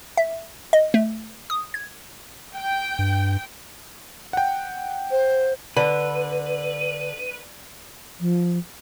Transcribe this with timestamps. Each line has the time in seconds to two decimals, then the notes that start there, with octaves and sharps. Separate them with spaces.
0.17 E5
0.73 D#5
0.94 A3
1.50 D#6
1.74 G#6
2.54 G5
2.99 G2
4.33 F#5 G5
5.10 C5
5.77 D3 B4
8.20 F3